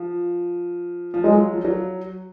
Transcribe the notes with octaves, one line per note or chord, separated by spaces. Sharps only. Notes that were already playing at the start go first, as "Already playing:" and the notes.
Already playing: F3
F3
F#3 G#3
F3
F#3